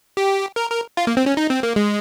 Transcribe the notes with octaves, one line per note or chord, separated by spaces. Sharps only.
G4
A#4
A#4
F4
A#3
C4
C#4
D#4
C4
A#3
G#3